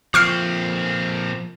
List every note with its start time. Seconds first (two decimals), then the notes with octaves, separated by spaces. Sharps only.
0.14 A#2 F3 C4 C#6 F6 C7